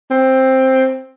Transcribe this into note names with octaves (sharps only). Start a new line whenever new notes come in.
C4